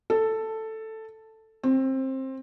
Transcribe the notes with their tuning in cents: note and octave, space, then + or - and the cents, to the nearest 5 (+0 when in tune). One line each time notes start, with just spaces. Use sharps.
A4 +5
C4 +20